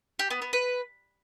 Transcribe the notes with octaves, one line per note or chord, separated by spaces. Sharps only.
G4
B3
B3
B4